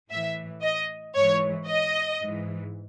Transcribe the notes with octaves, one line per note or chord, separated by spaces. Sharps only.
A2 E3 E5
D#5
G#2 E3 C#5
D#5
G#2 E3